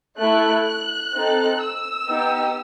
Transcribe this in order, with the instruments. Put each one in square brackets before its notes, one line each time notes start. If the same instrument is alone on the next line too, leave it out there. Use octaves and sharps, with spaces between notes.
[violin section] A3 E4 A4 F#6
F#6
C4 D#4 A4
E6
B3 D#4 G4